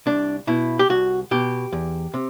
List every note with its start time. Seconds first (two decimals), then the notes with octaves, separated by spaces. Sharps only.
0.06 C2 D4
0.47 B2 E4
0.79 G4
0.89 C2 F#4
1.31 B2 G4
1.72 E2
2.14 C3